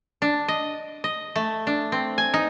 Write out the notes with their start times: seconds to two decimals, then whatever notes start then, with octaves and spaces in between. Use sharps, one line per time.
0.22 D4
0.48 D#5
1.04 D#5
1.36 A3
1.67 D4
1.92 C4
2.18 G#5
2.34 D#4